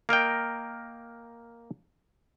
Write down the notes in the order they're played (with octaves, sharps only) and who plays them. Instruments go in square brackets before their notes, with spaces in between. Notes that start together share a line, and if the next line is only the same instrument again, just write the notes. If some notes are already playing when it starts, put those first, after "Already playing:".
[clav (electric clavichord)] A#3 A#4 D#5 G5